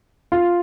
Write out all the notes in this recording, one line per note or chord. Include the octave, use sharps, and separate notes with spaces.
F4